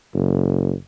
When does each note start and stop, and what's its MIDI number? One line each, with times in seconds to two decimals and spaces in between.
0.14 0.73 30